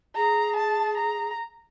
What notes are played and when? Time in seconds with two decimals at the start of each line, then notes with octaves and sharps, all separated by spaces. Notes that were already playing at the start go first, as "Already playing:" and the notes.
0.15 G#4 A#5
0.57 A5
0.98 A#5